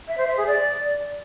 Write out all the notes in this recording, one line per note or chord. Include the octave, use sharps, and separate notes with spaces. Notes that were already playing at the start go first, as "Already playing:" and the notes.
E5
C5
E5
G#4
D5